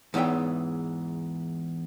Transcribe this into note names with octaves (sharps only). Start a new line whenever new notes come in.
E2 G#2 E3 C#5 E5 G5